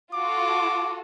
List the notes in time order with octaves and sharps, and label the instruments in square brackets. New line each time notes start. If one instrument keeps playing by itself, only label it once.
[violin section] F4 F#4 A4 [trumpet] D6